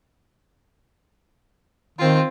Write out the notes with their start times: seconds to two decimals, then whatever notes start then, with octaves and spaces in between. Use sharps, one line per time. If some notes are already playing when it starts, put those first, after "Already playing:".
1.99 D#3 C4 F4